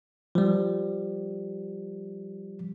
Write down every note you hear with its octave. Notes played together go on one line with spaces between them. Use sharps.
F3 G3